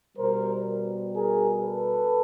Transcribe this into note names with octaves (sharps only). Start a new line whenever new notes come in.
B2 G3 A#4 C5
G#4 A#4
A4 B4